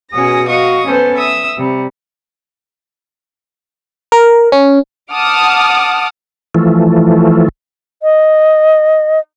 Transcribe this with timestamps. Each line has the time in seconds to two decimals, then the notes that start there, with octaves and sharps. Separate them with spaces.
0.12 B2 C#4 F#4 G#4 D#6 A#6
0.49 F#4 D#5 F5 C#6 D#6
0.87 B3 C#4 A4 B4 C5
1.18 E5 D#6 E6
1.58 C3 G3
4.12 A#4
4.52 C#4
5.12 F#5 A5 D6 D#6 F6
6.55 E3 F3 A3
8.03 D#5